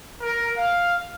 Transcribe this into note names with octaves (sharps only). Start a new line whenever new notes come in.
A#4
F5